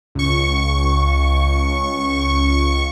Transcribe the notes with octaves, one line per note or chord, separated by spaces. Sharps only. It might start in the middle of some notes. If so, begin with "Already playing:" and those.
C#2 C#6